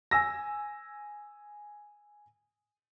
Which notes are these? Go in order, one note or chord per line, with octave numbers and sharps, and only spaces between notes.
G#5 E6 A#6